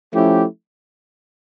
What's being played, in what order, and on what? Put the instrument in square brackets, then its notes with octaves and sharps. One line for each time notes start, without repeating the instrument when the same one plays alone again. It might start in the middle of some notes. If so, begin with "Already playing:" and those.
[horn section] F3 A3 C#4 E4 G4